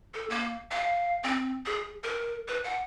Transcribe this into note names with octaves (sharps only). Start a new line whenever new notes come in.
A4
A#3
F5
C4
G#4
A#4
B4
F#5